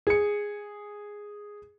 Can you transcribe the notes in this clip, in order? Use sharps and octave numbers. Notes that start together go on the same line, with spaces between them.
G#4 C#7